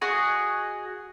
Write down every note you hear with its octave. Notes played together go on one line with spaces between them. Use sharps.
F#4 G#4 D#5